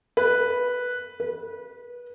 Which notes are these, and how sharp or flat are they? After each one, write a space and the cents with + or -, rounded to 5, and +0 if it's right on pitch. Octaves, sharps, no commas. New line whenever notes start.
B4 -5
B4 -25